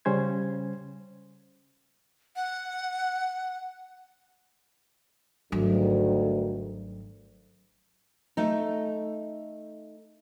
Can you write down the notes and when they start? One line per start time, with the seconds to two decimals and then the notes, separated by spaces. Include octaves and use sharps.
0.05 C#3 G3 C#4 C5 G#6
2.36 F#5
5.52 G#1 D2 G2 D#3 F#3
8.37 A3 D#4